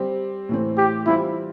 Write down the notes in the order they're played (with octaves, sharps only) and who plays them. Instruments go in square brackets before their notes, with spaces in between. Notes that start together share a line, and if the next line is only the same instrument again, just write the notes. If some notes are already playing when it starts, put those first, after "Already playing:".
Already playing: [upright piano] G3 C4 G4
A2 E3 A3 C4
[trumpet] G4
[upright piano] E3 G3 C4 F4 [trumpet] E4